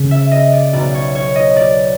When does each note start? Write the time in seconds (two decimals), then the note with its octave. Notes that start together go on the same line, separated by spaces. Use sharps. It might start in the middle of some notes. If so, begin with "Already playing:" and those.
Already playing: C#3
0.11 E5
0.32 D#5
0.53 D5
0.73 B1 B2 F#3 D5
0.94 C#5
1.15 C#5
1.36 D#5
1.56 D5